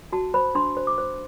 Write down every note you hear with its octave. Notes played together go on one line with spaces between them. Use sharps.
F#4 A5
C5 B5
D4 C6
C5
D6
C5